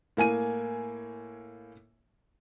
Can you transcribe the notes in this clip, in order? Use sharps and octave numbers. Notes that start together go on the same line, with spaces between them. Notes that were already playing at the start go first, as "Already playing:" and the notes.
A2 A#3 G#5 D#7